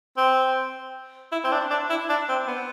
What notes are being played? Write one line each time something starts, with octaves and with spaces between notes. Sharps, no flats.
C4
E4
C4
D4
D4
E4
D4
C4
B3